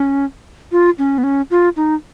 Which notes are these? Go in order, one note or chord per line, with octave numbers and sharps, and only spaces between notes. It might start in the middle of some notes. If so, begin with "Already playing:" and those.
Already playing: C#4
F4
C#4
B3
C#4
F4
D#4